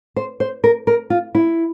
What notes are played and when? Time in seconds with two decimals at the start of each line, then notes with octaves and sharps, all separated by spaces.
0.16 C5
0.40 C5
0.64 A#4
0.87 A#4
1.10 F4
1.35 E4